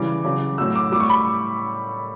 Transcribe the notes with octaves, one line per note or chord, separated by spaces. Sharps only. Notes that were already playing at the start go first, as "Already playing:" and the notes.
Already playing: C#3 E3 G3 D6
C#3 F#3
A2 F#3 E6
D6
A2 G3 C#6 D6
B5